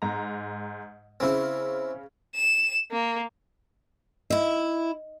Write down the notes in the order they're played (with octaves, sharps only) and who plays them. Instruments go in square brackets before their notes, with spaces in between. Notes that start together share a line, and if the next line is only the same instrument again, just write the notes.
[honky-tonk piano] G#2 A#5
[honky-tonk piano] C#3 C#4 [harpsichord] C4 E4
[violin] E7
A#3
[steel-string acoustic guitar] E4 E5 [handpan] D#5